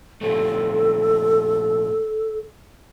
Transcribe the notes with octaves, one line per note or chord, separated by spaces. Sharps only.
A#2 F3 A3 A4